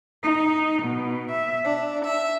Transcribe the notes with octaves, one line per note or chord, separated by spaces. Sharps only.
D#4
B2
E5
D4
E5